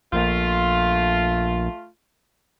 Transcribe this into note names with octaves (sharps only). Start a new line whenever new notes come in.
A#1 A3 F4